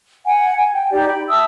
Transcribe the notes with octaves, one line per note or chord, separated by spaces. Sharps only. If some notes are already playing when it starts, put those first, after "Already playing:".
F#5 G#5
G#5
G5
D#4 G4 D5
G5 B5
E5 A5 D#6 E6